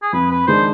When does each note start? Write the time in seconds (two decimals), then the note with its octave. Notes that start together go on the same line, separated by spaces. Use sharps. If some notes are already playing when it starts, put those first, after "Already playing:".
0.02 G#4
0.13 F2 B4
0.31 B4
0.47 D#3 G#3 D4 C5